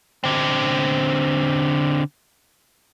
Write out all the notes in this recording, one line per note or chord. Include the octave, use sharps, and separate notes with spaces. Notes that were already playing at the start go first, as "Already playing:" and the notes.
D3 C4